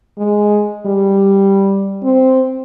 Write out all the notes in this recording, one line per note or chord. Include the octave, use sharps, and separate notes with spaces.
G#3
G3
C4